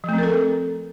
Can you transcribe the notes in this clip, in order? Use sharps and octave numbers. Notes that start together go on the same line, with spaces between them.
F3 A3 C4 A4 A#4